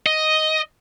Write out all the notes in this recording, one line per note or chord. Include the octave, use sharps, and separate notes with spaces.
D#5